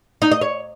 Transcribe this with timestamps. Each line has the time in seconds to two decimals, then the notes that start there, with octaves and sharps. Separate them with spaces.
0.22 D#4
0.32 D#5
0.41 C#5